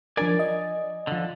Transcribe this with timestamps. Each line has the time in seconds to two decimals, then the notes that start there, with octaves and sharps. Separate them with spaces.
0.17 F3 D4 A#4 D5 G#5
0.39 D#5
1.07 D3 F3